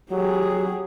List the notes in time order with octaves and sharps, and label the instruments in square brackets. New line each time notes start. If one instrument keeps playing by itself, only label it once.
[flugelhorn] F#3 [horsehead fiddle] G4 G#4